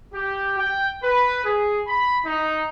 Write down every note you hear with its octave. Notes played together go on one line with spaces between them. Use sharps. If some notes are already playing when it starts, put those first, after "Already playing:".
G4
G5
B4
G#4
B5
D#4